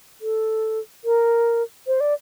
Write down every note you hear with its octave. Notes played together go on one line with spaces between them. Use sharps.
A4
A#4
C5
D5